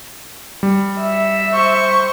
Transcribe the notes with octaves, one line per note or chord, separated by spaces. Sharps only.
G3
E5
C5 C#6